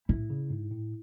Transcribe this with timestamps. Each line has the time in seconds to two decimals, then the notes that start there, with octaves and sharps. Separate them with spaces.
0.09 A2 E4
0.30 C#3
0.50 G#2
0.71 A2